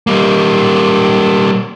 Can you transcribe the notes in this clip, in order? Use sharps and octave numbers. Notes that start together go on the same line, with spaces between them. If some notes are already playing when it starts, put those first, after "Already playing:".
G3 A#3